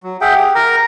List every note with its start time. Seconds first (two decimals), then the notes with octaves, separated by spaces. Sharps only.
0.03 F#3
0.21 G#4 E5 F#5 G5
0.35 G4
0.55 A#4 A#5